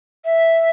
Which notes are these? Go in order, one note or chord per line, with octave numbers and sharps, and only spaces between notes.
E5